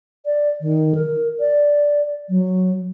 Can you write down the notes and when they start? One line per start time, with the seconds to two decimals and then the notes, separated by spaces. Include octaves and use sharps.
0.26 D5
0.61 D#3
0.95 A#4
1.40 D5
2.29 F#3